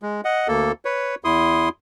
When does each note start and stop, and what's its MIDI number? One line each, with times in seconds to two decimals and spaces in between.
0.02 0.21 56
0.25 0.48 75
0.25 0.48 78
0.48 0.72 38
0.48 0.72 58
0.48 0.72 69
0.85 1.15 71
0.85 1.15 73
1.24 1.69 40
1.24 1.69 64
1.24 1.69 84
1.24 1.69 87